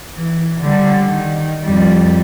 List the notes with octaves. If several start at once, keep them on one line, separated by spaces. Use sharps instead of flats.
E3
D3 G3
D#3
F2 G3